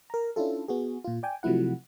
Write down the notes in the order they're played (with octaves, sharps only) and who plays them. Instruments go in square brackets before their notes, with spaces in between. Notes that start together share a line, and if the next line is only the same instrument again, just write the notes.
[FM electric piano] A#4 A#5
C#4 D4 E4 F4 A4
B3 F#4 G#4
A#2 F4
D5 G5 G#5
C3 F3 F#3 A3 E4 F#5